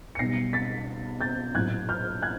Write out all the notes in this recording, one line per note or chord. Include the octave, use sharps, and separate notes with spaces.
C#7
B1 B2 G3 A#6 C7
A6 B6
G6 A6
A#1 A2 F#3 F#6 G#6
F6 G6
F#6 G#6